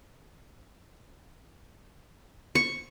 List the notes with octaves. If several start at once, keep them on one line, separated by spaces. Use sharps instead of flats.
C#6